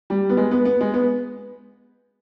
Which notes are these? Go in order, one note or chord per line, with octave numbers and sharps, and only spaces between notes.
G3
B3
G#3
B3
B3
G#3
B3